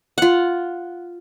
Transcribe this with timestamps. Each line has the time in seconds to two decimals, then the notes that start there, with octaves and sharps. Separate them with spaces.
0.18 F4 F#5